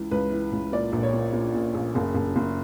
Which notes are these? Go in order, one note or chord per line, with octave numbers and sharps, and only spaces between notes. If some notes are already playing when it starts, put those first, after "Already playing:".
Already playing: C#2 E3
C#2 B4
E3
C#2
A#2 D5
A#1
C#5
A#2
A#2
A#2
A#1
F#1
F#1
F#1